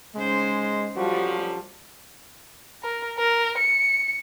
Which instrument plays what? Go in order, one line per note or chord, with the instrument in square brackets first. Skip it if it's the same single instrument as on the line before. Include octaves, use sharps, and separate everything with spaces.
[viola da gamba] C#3 D#4 C5 [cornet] G#3
[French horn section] F#2 D3 F3 [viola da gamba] G3 [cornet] F#4
[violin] A#4
A#4
C#7